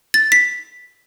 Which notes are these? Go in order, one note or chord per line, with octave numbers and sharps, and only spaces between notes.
A6
B6